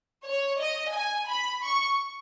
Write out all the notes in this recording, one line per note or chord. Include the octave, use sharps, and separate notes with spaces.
C#5
D#5
G#5
B5
C#6